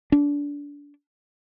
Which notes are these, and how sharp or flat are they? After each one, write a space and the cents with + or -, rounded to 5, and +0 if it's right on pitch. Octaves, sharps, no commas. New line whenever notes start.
D4 -25